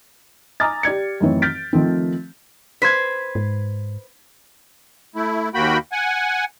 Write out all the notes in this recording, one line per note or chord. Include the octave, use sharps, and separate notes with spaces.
G#5 A#5 D6 D#6 F6 A6
G4 D5 G#6 C#7
F#2 A2 D#3 E3 C4 C#5
F6 G6 A6 B6 D7
D#3 F3 A3 C4
B4 C5 G#6 B6
G#2
A3 E4
D#2 A#3 F#4 G5 B5
F#5 G#5